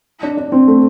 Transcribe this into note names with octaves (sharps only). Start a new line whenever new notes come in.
D4
D4
C4
A3